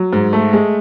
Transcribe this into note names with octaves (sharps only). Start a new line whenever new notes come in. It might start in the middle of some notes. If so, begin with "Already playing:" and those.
Already playing: F#3
G#2
A3
G#3